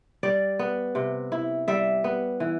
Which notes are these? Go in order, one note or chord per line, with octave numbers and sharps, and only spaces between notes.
G3 D5
B3
C3
E4
G3 E5
B3
E3